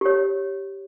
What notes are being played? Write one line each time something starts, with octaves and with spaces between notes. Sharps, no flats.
G4 C#5